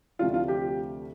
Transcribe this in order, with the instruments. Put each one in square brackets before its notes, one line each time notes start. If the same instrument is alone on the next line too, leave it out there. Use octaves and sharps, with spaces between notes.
[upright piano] D2 C3 F3 A3 D4 F4
F4
G4